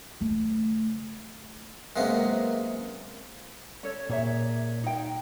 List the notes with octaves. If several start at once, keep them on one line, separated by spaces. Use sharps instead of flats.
C#3 A3
F#2 C3 G#3 A#3 B3
C#4 A4 C#5
A#2 G#4 C#5 E5
D#4 G5